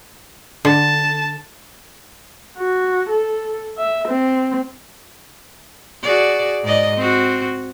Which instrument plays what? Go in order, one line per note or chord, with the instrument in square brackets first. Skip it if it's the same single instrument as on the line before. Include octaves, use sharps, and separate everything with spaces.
[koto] D3 [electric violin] A5
[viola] F#4
A4
E5
C4
[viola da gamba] F#4 G#4 D5
G#2 D5 D#5
C4 F#4